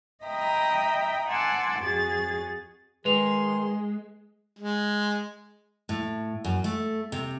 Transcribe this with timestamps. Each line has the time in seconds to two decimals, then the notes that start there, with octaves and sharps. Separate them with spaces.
0.24 D#5 E5 G5 A#5 B5 D#6
1.27 F#5 G#5 A5 C6 D6 E6
1.80 F2 F#4 G#4 A6
3.05 D#3 G#3 G#4 B4 C6 F7
4.58 G#3
5.89 A2
6.44 F#2
6.64 A3
7.12 C3